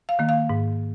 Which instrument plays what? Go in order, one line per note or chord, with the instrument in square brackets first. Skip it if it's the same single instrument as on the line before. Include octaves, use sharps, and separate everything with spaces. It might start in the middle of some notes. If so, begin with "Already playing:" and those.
[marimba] F5
D#3 A#3
F5
G#2